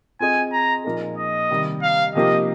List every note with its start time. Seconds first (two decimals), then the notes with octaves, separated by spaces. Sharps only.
0.20 C4 F4 G#4 D#5 G#5
0.53 A#5
0.85 A#2 F3 A#3 D#4 G#4
1.18 D#5
1.51 C3 D#3 G3
1.82 F5
2.15 C3 F3 A#3 D#4 G4 D#5